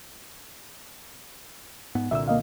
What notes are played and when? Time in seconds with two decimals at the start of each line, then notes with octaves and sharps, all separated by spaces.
1.95 G#2 B3
2.11 C2 A#2 D3 E5 E6
2.28 A#3 D#5 F5